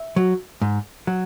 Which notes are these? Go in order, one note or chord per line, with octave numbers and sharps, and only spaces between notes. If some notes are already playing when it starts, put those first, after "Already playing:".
Already playing: E5
F#3
G#2
F#3